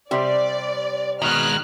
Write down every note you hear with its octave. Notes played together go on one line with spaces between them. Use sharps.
C3 G3 D5
B2 D#3 G#3 F6 F#6